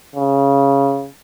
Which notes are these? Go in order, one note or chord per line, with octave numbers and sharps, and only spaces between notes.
C#3